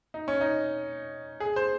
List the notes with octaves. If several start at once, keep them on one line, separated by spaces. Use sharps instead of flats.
D#4
C#4
D#4
G#4
C5